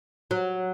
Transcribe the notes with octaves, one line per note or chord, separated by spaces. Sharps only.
F#3